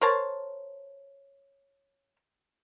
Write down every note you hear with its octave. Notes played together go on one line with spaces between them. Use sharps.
A#4 C5 C#5 A5